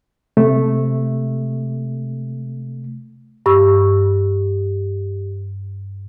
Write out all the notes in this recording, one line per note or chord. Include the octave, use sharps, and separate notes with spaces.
C3 A3
G2 G4 C#6 E6